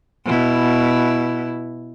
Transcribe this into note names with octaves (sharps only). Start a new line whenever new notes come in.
B2 E4